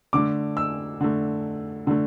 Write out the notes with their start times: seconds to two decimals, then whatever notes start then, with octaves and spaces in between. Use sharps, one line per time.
0.13 D3 A3 D6
0.57 E6
1.01 D3 A3
1.87 D3 A3